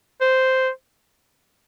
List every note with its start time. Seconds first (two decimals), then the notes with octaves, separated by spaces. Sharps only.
0.21 C5